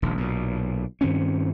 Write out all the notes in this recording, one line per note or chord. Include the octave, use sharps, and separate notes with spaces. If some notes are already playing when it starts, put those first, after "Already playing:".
D#1 A#1 D#2
B1 A#2
G2 D#3 C4 C#4